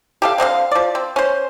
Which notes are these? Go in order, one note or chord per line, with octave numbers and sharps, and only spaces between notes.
G4 A4 F5
D3 C4 D#5 F5
F3 D5
C4
C#4 C5